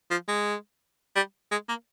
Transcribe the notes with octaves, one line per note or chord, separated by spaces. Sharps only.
F3
G#3
G3
G#3
A#3